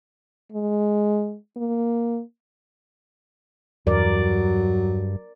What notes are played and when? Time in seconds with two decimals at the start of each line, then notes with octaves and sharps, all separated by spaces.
0.52 G#3
1.57 A#3
3.87 E2 G2 F#3 A#4 D5